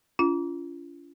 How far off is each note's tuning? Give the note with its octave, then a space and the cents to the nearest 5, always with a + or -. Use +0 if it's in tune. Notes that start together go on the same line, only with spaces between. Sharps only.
C#4 +45 F4 -30